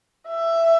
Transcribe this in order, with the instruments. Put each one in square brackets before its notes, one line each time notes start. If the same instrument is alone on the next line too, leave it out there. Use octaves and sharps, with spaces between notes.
[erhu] E5